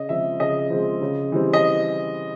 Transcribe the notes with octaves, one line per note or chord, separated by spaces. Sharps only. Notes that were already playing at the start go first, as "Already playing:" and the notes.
Already playing: C#3 D#5
F3 G#3 C4 E5
C#3 D#5
F3 G#3 C4
C#3
E3 G3 C4
D#5